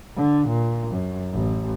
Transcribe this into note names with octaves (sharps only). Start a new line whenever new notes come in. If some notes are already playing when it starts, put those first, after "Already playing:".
D3
A#2
F#2
A1